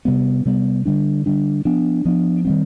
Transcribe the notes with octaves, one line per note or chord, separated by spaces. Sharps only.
C3 G3 B3
C3 G3 B3
D3 G3 D4
D3 G3 D4
F3 B3 D4
F3 B3 D4
D#3 G3 C4